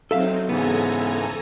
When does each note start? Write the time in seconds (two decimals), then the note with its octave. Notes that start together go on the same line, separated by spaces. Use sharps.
0.11 F#3 C4 D#4 A4 E5 F5
0.49 G#2 C#3 E3 B3 A4 G#5 A#5